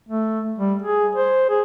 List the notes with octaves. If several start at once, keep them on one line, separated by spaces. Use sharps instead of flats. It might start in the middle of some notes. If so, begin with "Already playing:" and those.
A3
G3
G#4
C5
G#4